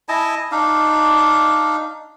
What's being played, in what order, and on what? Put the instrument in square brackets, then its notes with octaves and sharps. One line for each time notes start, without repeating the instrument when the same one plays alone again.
[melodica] E4 D#5 G#5 A5
D4 D#4 F5